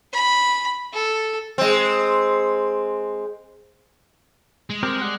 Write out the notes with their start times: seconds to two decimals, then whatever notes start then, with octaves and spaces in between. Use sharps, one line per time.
0.13 B5
0.94 A4
1.58 G#3 C4
4.70 G#3
4.83 C4 G4 A#4
5.01 D5 F#5